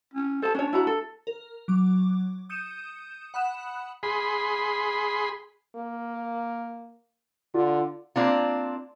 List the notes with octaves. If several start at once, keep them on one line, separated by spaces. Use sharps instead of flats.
C#4
A4 C5 A5
C#4 D4 C#5
E4 F#4 A#5
A4
A#4
F#3 D6
D#6 G6 C#7 D#7 E7
F#5 B5 D#6 F#6 E7
G#4 B5 C6
A#3
D3 F4
A#3 C4 D4 F4